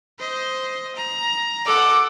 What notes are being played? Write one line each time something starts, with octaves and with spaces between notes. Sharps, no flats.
C5 D#5
A#5
A4 F#5 D6